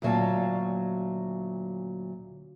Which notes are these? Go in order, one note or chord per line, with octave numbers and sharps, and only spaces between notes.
D2 A#2 F#3 F5 A5